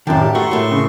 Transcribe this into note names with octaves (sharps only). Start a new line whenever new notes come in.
F#2 A2 D#3 E4 A#4 D5 G5 A5
G4 F5
A3 F#4 E5 A#5 C6 C#6
A2 A3 A#4
C#3